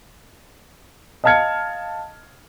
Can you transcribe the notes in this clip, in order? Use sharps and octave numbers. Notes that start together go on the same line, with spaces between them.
D#5 F5 A5 F6 G#6 C#7